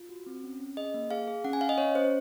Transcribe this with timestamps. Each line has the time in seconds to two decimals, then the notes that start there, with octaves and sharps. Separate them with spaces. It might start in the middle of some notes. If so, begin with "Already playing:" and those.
Already playing: F4
0.09 F#4
0.26 C4
0.44 C#4
0.60 C#4
0.77 G#4 D#5
0.94 A#3
1.11 G#4 F5
1.28 G#4
1.44 C#4 F#5
1.53 G#5
1.61 C#4 F5
1.69 D#5
1.78 C#4 C#5
1.95 C#4 C5